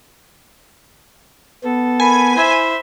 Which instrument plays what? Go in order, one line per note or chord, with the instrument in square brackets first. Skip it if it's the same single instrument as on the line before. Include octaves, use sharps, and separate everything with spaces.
[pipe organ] B3 [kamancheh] A4
[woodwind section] A#4 B5 [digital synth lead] G#5
[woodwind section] E4 B5 [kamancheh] C5 E5